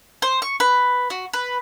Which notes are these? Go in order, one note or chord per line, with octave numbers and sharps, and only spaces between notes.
C5
C#6
B4
F#4
B4